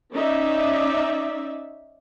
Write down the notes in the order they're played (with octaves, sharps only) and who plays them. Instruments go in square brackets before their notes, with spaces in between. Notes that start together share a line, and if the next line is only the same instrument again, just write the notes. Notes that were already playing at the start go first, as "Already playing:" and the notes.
[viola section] C#4 D#4 D5 E5